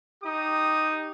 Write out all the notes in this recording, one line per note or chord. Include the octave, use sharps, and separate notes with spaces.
D#4 G4 D#6